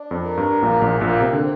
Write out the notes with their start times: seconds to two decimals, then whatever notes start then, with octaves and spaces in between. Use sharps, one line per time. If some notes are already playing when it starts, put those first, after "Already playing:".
Already playing: D4
0.11 F2
0.24 A#4
0.37 G2
0.62 A#1 A#2 A#3
0.82 A#1 A#2
1.01 A#1 A#2 A#3
1.21 C3
1.33 D3
1.39 C4